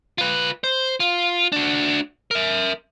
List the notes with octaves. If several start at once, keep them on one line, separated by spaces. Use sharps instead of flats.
F4 B4
C5
F4
D4 F#4
A#4 E5